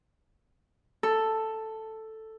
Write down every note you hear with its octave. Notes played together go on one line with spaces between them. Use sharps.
A4